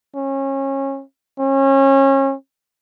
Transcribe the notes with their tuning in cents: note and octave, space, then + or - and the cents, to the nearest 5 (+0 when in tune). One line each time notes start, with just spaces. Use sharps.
C#4 -25
C#4 -30